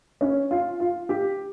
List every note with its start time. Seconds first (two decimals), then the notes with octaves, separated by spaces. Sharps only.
0.21 C#4
0.51 F4
0.80 F4
1.09 G4